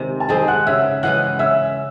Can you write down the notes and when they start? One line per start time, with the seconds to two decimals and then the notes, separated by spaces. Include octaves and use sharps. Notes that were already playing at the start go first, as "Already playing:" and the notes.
Already playing: C3 D#3 G#3 C4
0.20 A5
0.29 D#3 G#3 C4 G#4 G#5
0.48 F#5 F#6
0.66 C#3 E5 E6
1.03 E3 G#3 C#4 F#5 F#6
1.39 C#3 E5 E6